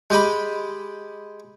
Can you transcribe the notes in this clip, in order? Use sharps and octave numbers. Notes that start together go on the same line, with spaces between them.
G#3 G4 D#5 B5